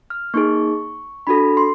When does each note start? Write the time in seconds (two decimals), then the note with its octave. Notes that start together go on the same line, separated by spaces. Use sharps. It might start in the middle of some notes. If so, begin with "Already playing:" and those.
0.10 F6
0.34 A#3 D#4 G#4 C#6
1.27 D4 F#4 A4 B5
1.57 C6